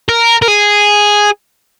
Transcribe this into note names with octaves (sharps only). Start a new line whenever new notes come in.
A#4
A#4
G#4